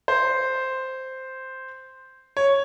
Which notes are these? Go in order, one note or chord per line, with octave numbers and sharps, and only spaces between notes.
C5
C#5